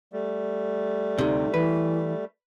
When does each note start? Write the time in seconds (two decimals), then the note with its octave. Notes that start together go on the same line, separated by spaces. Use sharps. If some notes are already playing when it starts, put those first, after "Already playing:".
0.13 G3 A3
1.18 D2 C3 D#4
1.54 E3 B4